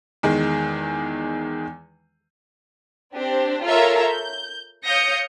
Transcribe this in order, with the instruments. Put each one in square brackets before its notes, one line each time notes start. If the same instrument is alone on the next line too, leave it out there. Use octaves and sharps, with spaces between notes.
[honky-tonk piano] E2 D#3 G#3
[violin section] C4 D4 G4 C5
F4 A4 A#4 C#5 E5 F5
G6
C#5 F5 D#6 G6 A#6 C#7